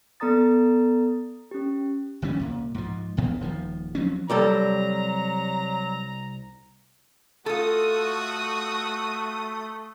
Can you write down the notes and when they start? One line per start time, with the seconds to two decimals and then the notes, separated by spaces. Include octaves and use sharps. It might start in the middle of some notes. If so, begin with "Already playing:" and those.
0.20 B3 A4 D5 A#5 D#6 A6
1.51 C#4 G4
2.22 G1 E3 G3 C#4
2.40 C2 A#2
2.75 G#2 F3
3.17 E1 D2 G#2 B3
3.41 D#1 D#3 F3
3.95 F3 F#3 C4 C#4
4.30 C2 F#3 G3 A4 A#5
7.46 A3 F4 F#4 A4 D#6